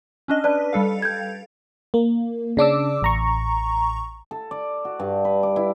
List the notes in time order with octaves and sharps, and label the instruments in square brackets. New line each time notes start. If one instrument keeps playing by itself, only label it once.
[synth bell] C#4 D4 D#5
[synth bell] B4 [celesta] D5 A5
[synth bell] G3 A4 F5
[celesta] G6 G#6
[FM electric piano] A#3
C#3 D4 D6 E6
A1 A#5 C#6
[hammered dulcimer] A4
D5
F#4
G2
B4
D6
E4